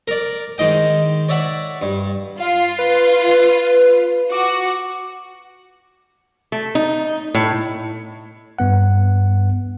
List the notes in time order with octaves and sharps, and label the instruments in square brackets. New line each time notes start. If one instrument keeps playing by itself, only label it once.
[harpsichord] A#4 D5
G#2 D#3 D#5 G5
C#5 D5 E5 F#5
G2
[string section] F4 [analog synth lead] F5
[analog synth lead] B4
[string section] F#4 [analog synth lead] D6
[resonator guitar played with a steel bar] A3
D#4
A2
[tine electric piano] G2 B3 F#5